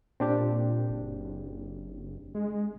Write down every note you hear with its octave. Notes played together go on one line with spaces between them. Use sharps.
A#2 C4 D4 G4
F#1
G#3